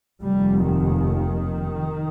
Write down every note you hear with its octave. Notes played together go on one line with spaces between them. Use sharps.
F1 D#2 G3
D#3